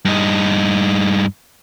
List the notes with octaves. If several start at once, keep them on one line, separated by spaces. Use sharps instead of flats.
G2 D#4